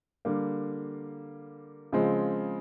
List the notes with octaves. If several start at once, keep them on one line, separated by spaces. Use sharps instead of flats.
D3 G3 A#3
C#3 F3 G#3 C4